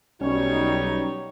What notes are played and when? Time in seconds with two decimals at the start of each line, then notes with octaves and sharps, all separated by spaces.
0.21 B1 F#3 G3 C#4 D#4 C#5